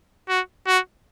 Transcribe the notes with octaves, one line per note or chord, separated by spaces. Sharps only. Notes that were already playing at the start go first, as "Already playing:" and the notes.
F#4
F#4